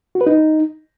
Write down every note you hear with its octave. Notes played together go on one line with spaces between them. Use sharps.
F#4
B4
D#4